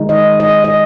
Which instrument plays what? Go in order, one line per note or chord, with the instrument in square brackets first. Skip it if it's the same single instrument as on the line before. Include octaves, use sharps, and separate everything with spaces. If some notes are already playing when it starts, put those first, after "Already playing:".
Already playing: [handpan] D#3 G#3 D#4
D#5
D#5
D#5